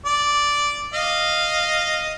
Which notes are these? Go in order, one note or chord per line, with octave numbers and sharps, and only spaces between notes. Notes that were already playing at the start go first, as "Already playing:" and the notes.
D5
D#5 F5